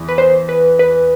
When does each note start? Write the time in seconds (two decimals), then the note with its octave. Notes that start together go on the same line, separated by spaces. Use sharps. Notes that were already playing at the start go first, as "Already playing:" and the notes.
Already playing: E2
0.09 B4
0.18 C5
0.49 B4
0.79 B4